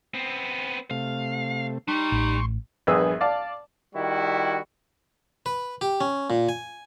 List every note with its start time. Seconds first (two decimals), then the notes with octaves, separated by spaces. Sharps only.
0.14 B3 C4
0.91 C3 A3 F5
1.88 G3 D#4 C6 C#6
2.12 A1
2.87 A#1 G2 B3 G#4 D#6 E6
3.21 D5 F5 A5
3.94 D#3 G3 E4 F#4
5.46 B4
5.81 G4
6.01 C#4
6.30 A#2
6.49 G#5